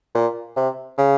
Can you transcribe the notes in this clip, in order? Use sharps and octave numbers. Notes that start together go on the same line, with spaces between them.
A#2
C3
C#3